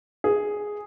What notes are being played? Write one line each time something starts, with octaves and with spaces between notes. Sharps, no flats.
G#4